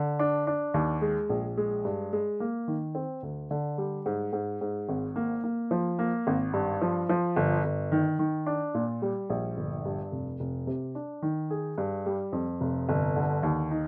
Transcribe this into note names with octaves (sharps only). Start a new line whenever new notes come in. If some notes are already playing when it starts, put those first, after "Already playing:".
Already playing: D3
D4
D4
D#2
G#3
A#1
G#3
G2
G#3
A#3
D#3
C4
D2
D3
G3
G#2
G#2
G#2
G#1
A#3
A#3
F3
A#3
G#1
G2
F3
F3
G1
G1
D#3
D#3
D4
A#2
G3
A#1
G1
G2
F1
F1
C3
D4
D#3
G#4
G2
G3
F2
F1
G1
D3
D#2
D#4